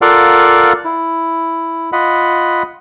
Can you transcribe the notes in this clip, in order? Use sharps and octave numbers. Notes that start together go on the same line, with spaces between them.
F4 A4 A#4 D5 F5 F#5
E4
F4 D#5 F#5 B5